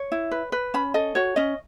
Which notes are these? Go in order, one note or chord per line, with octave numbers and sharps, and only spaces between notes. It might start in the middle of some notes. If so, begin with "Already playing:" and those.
Already playing: C#5
E4
B4
B4
C#4 B5
A4 D#5
F#4 C#5
C#4 D#5